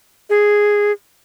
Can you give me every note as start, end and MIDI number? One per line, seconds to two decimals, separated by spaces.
0.30 0.92 68